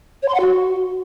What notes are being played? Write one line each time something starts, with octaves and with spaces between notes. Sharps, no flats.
C#5
C6
F#5
F#4